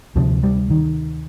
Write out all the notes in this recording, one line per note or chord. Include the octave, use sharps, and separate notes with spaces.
D2 C3 F3
G3
D#3